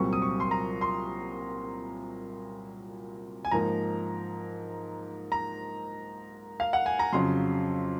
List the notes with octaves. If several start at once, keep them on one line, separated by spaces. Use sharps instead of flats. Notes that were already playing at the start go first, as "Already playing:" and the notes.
Already playing: C2 A#2 F#3 C4 C#6
D#6
C#6
C6
A#5
C6
G#5
G#2 F3 A#3 A#5
A#5
F5
F#5
G#5
A#5
F2 C#3 F#3 C6